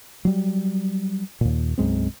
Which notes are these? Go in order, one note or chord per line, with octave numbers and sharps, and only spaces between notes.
F#3 G3
D#2 A#2
B1 F#2 G#3 C4